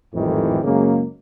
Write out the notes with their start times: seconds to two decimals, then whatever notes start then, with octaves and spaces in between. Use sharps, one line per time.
0.14 G#1 F2 A2 D#3 E3 G3
0.64 F#2 C#3 G#3 A#3